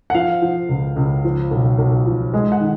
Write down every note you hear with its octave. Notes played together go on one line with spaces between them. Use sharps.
F#5
F3 F5
F3
C#2
C#2
F3
B1
B1
F3
G#3
F#5
D#3